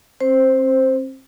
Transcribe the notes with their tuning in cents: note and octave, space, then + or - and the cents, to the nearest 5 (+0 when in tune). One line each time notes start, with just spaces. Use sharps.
C4 +35 C5 +0